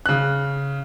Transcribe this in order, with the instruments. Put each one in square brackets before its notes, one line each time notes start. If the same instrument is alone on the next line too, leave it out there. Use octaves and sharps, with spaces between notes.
[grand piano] C#3 F#6